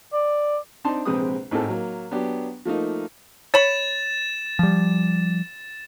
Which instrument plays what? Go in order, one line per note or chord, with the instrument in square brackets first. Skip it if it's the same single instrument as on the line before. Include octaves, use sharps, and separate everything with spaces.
[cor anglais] D5
[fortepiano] C4 D4 D#4 A5 C6
A#1 C3 G#3 C4 B4 D#6
G#1 A2 C4 A4
F#3 A#3
F#3 B3 D4 G4
F3 A3 A#3 D#4
[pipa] C#5 B5 [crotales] A6 E7
[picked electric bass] F3 G3